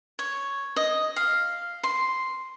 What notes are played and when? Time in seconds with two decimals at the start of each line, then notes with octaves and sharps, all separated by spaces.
0.19 C#5
0.76 D#5
1.16 F5
1.83 C6